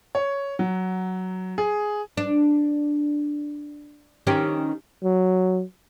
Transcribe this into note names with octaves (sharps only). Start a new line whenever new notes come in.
C#5
F#3
G#4
D4
D#3 C#4 G4
F#3